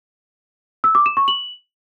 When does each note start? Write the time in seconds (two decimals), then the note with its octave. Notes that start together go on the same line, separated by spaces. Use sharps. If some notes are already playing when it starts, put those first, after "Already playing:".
0.84 E6
0.95 D6
1.06 E7
1.17 C#6
1.28 F#7